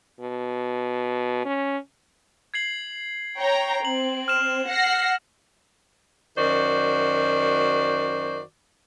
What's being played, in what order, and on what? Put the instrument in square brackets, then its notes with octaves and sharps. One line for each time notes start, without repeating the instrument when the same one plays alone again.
[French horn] B2
C#4
[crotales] G#6 C7 F#7
[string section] C#5 G5 A#5
[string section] C4 [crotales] F#7
[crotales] F6 E7
[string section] F#5 A#6 C7
[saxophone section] F#2 D#3 F#4 C5 D5